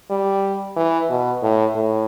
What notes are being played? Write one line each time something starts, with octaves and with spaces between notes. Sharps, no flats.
G3
E3
B2
A2
A2